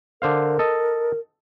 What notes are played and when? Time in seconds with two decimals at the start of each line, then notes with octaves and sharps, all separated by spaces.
0.22 D3 A#4 C5 F5
0.59 A4 D#5